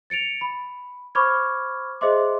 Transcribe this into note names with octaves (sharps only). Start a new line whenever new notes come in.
A6 C#7 D7 F7
B5
C5 B5 C#6 D6 F6 G#6
G#4 C5 D#5 E5 C6 D6